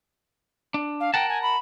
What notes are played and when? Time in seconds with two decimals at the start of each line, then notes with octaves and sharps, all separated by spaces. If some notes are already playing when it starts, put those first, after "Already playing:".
0.74 D4
1.00 F5
1.14 A#4 F#5 G5 A5
1.29 G#5
1.42 B5